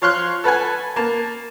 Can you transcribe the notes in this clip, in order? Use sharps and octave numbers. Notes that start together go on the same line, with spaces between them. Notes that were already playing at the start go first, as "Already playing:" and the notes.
F3 C#5 F5 C6 F6 F#6
A4 B4 F#5 G#5
A#3 A5